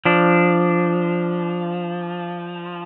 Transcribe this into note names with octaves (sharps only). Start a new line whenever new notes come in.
F3 D4